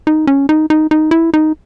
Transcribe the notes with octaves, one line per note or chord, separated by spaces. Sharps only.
D#4
C#4
D#4
D#4
D#4
E4
D#4